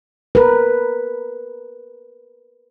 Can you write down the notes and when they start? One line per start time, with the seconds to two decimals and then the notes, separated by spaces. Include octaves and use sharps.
0.35 A#4 B4